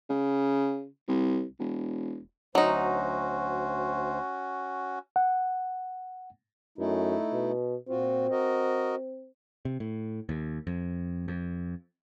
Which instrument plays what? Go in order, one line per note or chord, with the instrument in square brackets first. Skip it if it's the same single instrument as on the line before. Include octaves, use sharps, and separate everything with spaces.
[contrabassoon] C#3
C2
E1
[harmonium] D2 C5 [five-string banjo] F#3 D#4 [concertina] C#4 F#4
[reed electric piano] F#5
[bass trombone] F#2 [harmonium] A3 D#4 E4
[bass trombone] B2
[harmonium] A#2 F4 F#4 [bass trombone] C4
[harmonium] F#4 A#4 D#5
[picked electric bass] C3
A2
D#2
F2
F2